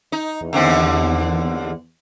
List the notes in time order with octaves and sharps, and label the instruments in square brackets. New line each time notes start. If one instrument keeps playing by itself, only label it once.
[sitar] D#4
[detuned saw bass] E2
[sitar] D#2 D3 C4